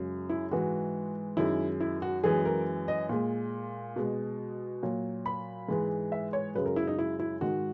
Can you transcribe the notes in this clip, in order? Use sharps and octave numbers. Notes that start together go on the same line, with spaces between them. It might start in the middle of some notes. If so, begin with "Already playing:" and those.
Already playing: F#2 C#3 G#3
E4
G#2 E3 G#3 F#4
F#2 D#3 G#3 E4
E4
F#4
F#2 E3 G#3 G#4
A#4
D#5
A#2 G#3
B2 G#3
A#2 F#3
B5
G#2 E3 G#3
E5
C#5
F#2 C#3 G#3 B4
A#4
E4
D#4
E4
E4
G#2 D#3 G#3 F#4